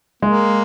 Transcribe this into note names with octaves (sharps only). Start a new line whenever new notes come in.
G#3 A#3